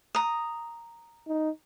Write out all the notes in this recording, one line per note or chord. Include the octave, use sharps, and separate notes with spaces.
A#5 D#6
D#4